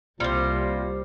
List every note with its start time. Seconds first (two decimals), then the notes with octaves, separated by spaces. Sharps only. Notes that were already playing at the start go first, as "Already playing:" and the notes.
0.20 C2 C3 G3 A#3 F4 C5